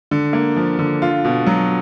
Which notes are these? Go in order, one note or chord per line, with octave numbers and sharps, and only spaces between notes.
D3
A#3
F3
D3
F4
B2
F#3